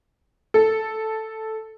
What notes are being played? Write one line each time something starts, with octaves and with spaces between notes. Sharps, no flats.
A4